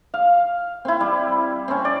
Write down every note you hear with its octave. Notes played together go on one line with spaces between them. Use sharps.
F5
C4 E4
G3
C4 C#4
D5